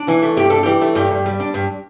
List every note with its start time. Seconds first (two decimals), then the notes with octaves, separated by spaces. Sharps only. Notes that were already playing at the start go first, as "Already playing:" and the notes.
Already playing: D4
0.08 E3
0.23 A3
0.37 G2 G4
0.50 D4 A4
0.63 E3 G4
0.81 A3
0.95 G2 G4
1.11 G2
1.26 G3
1.40 D4
1.54 G2